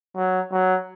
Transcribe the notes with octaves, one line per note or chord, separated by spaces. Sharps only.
F#3
F#3